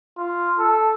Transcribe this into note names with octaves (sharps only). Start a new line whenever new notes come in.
F4
A4